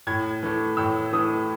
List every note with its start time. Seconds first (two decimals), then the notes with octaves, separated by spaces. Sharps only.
0.07 A2 G#6
0.43 E3 A3
0.77 A2 E6
1.13 E3 A3 D#6